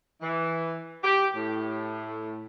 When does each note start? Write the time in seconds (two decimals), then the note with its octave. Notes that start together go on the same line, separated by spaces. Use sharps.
0.22 E3
1.04 G4
1.35 A2